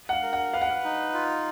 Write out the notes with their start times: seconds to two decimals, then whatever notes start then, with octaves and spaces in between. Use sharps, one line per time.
0.09 F#5
0.13 F5
0.23 A#4
0.33 F#5
0.53 B4 F5
0.61 F#5
0.70 F5
0.84 D#4
1.14 F4